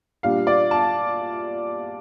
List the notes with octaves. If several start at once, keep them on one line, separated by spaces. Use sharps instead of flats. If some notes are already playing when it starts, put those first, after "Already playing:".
A#2 G3 D4 F5
D5
A5